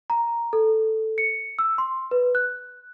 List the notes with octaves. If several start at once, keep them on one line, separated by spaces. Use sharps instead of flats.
A#5
A4
C#7
E6
C6
B4
F#6